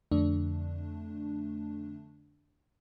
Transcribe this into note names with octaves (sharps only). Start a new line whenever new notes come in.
F2 D3 A3 D4